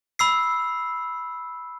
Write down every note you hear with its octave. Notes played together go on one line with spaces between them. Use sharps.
B5 E6 C7